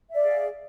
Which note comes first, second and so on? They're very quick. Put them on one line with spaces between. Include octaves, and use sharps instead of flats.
E5 D5 F5 G#4